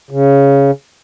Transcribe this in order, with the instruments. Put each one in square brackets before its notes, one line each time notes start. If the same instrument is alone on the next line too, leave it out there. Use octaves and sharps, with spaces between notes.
[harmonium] C#3